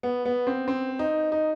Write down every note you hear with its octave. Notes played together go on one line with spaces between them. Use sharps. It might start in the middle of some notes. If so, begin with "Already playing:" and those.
B3
B3
C4
C4
D#4
D#4